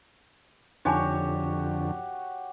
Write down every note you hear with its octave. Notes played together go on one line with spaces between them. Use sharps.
F2 D3 D#4 F#4 G4 C#5 G#5 A5